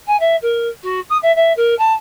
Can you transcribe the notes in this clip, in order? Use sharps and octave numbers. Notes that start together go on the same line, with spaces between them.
G#5
E5
A#4
F#4
D#6
E5
E5
A#4
A5